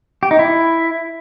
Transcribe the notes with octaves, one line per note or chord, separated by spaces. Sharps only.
G4
D#4
E4